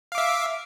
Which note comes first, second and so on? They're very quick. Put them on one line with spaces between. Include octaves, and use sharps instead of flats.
F5 D6 E5